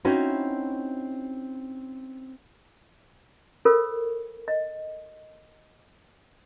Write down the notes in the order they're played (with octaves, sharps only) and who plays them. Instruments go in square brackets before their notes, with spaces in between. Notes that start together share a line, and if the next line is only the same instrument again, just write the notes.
[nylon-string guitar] C4 C#4 D#4 E4 F#4
[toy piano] F4 A4 A#4 C5
D#5